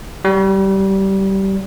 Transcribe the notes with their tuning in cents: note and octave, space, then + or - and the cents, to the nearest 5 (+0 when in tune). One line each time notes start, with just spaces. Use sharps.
G3 -20